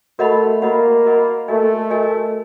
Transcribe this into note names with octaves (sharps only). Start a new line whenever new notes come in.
A3 F#4 A#4 D#5 F#5 B5
A#3 F#4 A#4 D#5 F#5 B5
F#4 A#4 D#5 F#5 B5
A3 F#4 A#4 D#5 G#5
F#4 A#4 D#5 G#5